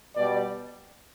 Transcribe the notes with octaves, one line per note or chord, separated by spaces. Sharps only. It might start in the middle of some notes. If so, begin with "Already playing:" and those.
B2 G3 D5